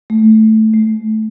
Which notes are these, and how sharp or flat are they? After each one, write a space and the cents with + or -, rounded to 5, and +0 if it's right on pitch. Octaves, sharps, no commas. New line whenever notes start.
A3 -5
A3 -30